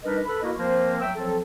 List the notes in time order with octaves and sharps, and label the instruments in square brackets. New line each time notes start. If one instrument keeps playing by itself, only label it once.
[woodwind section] G3 D4 D#4 A#4 B4 D#5
A4 B4 B5
A#3 E4 F#4 A#4 D#5
F3 A#3 C4 A#4 C5
F#3 E5 G5 E6
F3 F#3 C4 A4